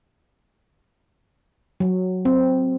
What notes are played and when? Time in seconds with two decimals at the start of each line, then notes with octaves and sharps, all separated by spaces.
1.80 F#3
2.25 C4